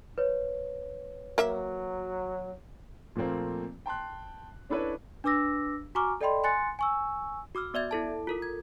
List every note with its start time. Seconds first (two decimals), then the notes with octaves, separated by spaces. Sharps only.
0.18 B4 C#5
1.38 F#3 A#3 E5
3.16 A#2 F3 A3 A#3 C4
3.86 G5 A5 C6 F#6
4.69 C#4 D4 E4 A4 B4 C#5
5.24 D4 B4 D6 E6 A#6
5.95 F#4 G#5 A#5 C#6 D6 F6
6.21 A4 D5 D#5 G5 B5 C6
6.44 G#5 C6 F#6 A6 C#7
6.79 G#5 C#6 E6
7.55 F#4 D6 E6 F6
7.74 B3 D5 E5 G#6
7.91 E4 A4 A5
8.27 F4 A4 A#4
8.42 G#6